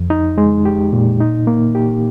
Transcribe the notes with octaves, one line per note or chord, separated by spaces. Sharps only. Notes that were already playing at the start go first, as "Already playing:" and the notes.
Already playing: F2
D#4
G#3
G4
A#2
D#4
A#3
G4